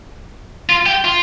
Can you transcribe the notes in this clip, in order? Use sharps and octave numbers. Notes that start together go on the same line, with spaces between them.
F4
G4
F4